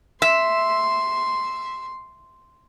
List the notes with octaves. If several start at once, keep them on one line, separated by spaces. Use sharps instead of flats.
E5 C6